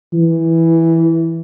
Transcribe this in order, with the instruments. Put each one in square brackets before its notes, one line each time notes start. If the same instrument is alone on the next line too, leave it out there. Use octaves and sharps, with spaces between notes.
[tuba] E3